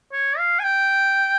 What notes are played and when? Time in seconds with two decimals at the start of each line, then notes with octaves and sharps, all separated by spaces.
0.13 C#5
0.38 F5
0.60 G#5
0.64 G5